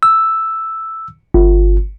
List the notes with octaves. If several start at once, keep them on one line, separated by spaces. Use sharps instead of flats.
E6
G1